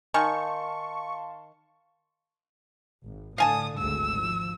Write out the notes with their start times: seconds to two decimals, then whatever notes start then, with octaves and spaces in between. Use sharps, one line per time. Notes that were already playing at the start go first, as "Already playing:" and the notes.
0.14 D#3 F5 G#5 A5 C6 C#6
3.04 G#1
3.38 A2 D3 F5 G#5 A5 D#6
3.78 G#1 D2 G#2 E6
4.16 F3